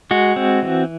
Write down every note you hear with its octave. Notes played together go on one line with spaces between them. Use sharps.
G#3 F#4
C4
E3